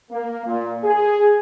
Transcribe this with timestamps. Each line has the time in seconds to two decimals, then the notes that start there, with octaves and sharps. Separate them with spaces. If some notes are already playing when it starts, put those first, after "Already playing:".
0.11 A#3
0.46 A#2
0.84 G#4